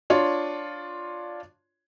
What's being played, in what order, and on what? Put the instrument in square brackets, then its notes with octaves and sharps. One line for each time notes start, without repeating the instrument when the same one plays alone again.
[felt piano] D4 F4 C#5 C6